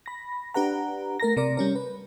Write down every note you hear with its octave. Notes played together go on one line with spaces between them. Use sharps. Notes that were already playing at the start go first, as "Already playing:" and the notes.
B5 A#6
D4 G4 B4 F#5 A#5
A3 A#4 A#5 A#6
C3 A#4 D5 A#6
G3 C#4 A#4
B4